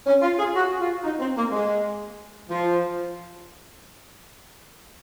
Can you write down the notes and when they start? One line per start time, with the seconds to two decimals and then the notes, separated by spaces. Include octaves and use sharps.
0.06 C#4
0.22 F4
0.38 G#4
0.55 F#4
0.79 F4
1.04 D#4
1.19 C4
1.36 A#3
1.52 G#3
2.49 F3